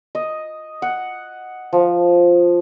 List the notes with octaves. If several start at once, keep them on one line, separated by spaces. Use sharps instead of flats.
D#5
F#5
F3